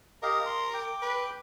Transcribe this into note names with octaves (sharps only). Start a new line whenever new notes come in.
G4 A#4 D#5 F5
C6
G5 D6
B4